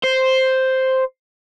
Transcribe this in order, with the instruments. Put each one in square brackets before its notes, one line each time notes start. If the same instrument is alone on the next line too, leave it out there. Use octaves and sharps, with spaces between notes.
[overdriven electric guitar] C5